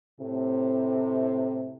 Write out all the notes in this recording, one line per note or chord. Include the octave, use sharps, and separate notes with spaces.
A2 C3